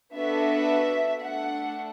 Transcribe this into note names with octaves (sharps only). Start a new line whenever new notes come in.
B3 D4 F#4 A4 E5
A3 D4 A4 F#5